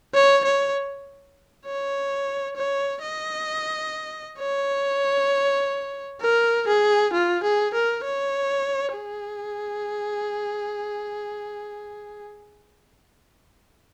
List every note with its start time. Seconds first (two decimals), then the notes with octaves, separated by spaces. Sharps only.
0.14 C#5
0.44 C#5
1.66 C#5
2.56 C#5
3.02 D#5
4.39 C#5
6.21 A#4
6.67 G#4
7.13 F4
7.43 G#4
7.74 A#4
8.04 C#5
8.95 G#4